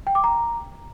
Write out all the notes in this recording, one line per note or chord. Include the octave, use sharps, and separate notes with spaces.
G5
D6
A#5